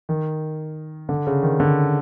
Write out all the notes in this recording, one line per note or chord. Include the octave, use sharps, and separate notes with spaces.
D#3
D3
C#3
D#3
D3